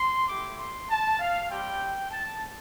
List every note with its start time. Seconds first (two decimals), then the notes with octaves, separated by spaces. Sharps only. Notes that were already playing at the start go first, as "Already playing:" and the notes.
Already playing: C6
0.28 A3 E4 G4 D6
0.58 C6
0.90 A5
1.20 F5
1.50 G3 C4 G4 G5
2.11 A5